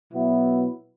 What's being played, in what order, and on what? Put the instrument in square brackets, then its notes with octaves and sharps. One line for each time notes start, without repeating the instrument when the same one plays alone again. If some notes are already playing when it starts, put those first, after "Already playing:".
[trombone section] B2 F#3 B3 E4